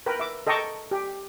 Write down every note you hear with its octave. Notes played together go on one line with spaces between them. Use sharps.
A#4 B4 G5
E5 D6
A4 D#5 G5 A#5 C#6 D6
G4